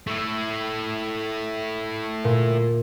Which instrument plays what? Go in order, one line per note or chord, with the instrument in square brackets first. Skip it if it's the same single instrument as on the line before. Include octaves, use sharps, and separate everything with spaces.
[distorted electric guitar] A3 E4
[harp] A#2